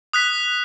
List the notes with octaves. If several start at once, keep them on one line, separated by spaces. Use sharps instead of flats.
D#6 F#6 B6